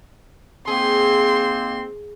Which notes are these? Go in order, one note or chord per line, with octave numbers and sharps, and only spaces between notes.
G#2 A#3 C4 G#4 C6